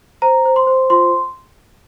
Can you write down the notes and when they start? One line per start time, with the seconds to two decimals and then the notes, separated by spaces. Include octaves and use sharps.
0.22 C5 A#5
0.46 C5
0.56 C6
0.67 C5
0.90 F4 C6